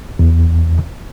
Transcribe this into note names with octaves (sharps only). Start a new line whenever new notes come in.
E2